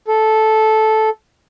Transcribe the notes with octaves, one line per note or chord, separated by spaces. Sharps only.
A4